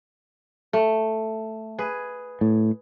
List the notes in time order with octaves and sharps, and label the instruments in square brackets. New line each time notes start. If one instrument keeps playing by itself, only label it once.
[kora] A3
G#4 B4
[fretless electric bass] A2